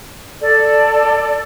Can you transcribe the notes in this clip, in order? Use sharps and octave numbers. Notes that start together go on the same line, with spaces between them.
A4 D5